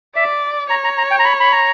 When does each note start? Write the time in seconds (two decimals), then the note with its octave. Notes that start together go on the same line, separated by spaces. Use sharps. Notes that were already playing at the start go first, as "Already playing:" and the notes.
0.16 D5 E5
0.70 C#5 A#5
0.84 A#5
0.98 A#5
1.11 G5
1.19 A#5
1.25 B5
1.40 B5
1.52 A#5